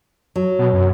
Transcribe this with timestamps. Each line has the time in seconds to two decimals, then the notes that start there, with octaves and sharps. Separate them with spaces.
0.36 F#3
0.59 B2
0.73 F#2